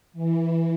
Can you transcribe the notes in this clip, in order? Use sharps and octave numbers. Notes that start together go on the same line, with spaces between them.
E3